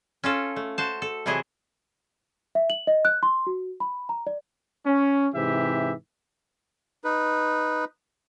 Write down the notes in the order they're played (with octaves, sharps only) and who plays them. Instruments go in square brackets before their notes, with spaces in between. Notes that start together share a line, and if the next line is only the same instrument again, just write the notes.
[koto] C#4 F4 A4
A3
F#4 C5 A5
A4
C3 E3 F#3 E4 G#4 D#5
[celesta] E5
F#7
D#5
F#6
C6
F#4
B5
A#5
D5
[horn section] C#4
G#2 C3 E3 G4 E5
[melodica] D#4 B4